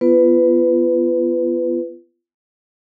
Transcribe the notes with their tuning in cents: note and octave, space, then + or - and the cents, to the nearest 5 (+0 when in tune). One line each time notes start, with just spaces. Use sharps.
B3 +0 F4 -30 B4 +20